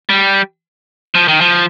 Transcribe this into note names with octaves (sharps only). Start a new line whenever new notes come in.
G3
F3
D#3
F3